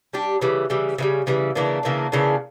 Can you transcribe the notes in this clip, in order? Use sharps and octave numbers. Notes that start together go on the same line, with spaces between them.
G3 D4 G4
C#3 E3 G3
C#3 E3 G3
C#3 E3 G3
C#3 E3 G3
C#3 E3 A#3 D4
C#3 E3 A#3 D4
C#3 E3 A#3 D4